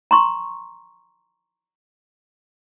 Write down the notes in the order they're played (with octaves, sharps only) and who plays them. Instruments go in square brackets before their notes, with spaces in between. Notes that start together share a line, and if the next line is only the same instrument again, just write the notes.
[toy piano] A#5 C6 C#6